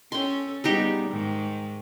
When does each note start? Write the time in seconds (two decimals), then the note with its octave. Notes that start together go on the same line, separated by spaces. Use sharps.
0.12 C#4 A4 G5 C6
0.64 G3 G#3 B3 D#4 G4
1.10 G#2 D#3